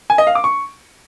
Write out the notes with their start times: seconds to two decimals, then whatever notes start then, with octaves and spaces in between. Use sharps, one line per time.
0.10 G#5
0.18 D#5
0.27 F5
0.35 D6
0.44 C#6